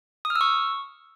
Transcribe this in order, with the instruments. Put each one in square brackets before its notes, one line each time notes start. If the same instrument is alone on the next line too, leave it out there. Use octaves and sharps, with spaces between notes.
[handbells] D#6
F6
E6
C#6